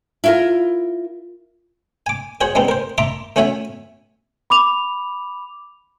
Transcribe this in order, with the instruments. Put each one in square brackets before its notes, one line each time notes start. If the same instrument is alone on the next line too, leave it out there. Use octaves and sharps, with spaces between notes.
[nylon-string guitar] E4 F4 A#4
[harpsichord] G#5 D6
F#4 G#4 C5 C#5 F#5
G3 G#3 B3 C4 D#4
A#4 C5
E5 A5 A#5 C6 D6
A3 C#4 F#4 C#5 E5 G#5
[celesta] B5 D6 F7